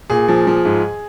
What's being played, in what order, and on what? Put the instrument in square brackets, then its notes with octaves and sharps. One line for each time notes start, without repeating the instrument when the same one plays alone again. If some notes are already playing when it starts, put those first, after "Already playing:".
[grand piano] A#2 G#4
F3
F3
G#2